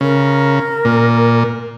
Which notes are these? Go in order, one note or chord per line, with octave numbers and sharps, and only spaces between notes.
C#3 A#4
A#2